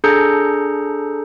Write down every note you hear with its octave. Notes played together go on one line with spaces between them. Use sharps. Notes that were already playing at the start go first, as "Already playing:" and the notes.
D4 G#4 A4 A#5 G6 C#7